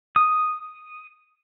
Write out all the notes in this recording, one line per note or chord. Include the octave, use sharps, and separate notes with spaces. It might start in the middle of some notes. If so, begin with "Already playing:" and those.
D#6